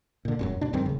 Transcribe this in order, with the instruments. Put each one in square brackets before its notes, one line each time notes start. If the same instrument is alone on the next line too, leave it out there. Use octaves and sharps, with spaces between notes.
[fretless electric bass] A#2 D3
D#1 F#2 F#3
B2 D4
G#1 F#2 D#3 C4
D#1 C#3